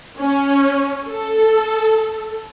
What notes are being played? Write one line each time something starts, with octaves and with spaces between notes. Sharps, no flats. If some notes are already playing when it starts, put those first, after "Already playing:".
C#4
A4